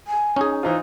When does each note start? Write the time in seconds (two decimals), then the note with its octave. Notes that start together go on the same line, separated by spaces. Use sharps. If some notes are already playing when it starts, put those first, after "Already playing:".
0.07 G#5
0.36 C#4 D#4 G#4
0.63 E3 D#4 F4 C5